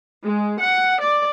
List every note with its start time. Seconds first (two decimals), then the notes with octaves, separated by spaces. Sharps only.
0.24 G#3
0.60 F#5
1.00 D5